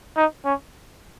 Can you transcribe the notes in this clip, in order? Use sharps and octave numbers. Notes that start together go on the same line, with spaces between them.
D#4
C#4